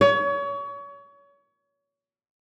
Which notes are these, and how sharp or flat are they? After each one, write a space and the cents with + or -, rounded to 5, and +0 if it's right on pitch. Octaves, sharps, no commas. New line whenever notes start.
C#5 +30